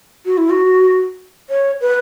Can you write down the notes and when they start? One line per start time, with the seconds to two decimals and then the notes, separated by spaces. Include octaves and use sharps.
0.26 F#4
0.38 E4
0.50 F#4
1.50 C#5
1.81 B4